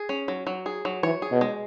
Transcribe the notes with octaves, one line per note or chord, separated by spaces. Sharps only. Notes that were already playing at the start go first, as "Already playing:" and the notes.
Already playing: G#4
C#4
F#3
F#3
G#4
F#3
E3 C#5
G#4
B2
G#3